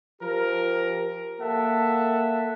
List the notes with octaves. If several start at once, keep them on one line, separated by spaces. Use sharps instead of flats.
F3 G4 A#4
A#3 A4 E5 F#5 A5